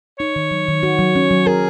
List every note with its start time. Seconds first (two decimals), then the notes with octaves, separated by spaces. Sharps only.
0.19 D#4 C#5
0.36 D#3
0.51 F#3
0.68 D#3
0.83 F#4
0.99 F#3
1.16 C#4
1.31 F#3
1.47 G#4 A#4